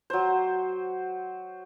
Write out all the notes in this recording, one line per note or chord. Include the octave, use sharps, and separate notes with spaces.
F#3 C5